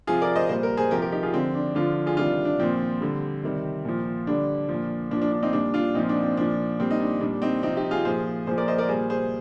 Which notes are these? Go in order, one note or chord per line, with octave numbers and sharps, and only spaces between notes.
C3 F3 F4 G#4
A#4 D5
C5 D#5
A#2 G3 C5
A#4
G#4 C5
C3 F3 G4 A#4
G4 A#4
D#4 G4
F4 G#4
D3 F3 C4
D4
D3 F3 D4 F4
F4 G#4
C3 D#3 G3 D4 F4
D4
A#2 F3 C4
D3 G3
C3 D#3 G3
A#2 F3
D3 G3 D4
F3
A#2
A#2 F3 D4
D4
D4
C4 D#4
A#2 G3 D4
D4 F4
A#2 F3 C4 D#4
D4
C4
A#2 F3 D4
A#2 G3 C4
D#4
D4
A#2 G3 D4
C4 D#4
C3 F3 C4 D#4
D#4 G4
F4 G#4
A#2 F3 G#4 C5
A#2 F3 G#4 C5
A#4 D5
C5 D#5
A#4 D5
A#2 G3 G#4 C5
G#4 C5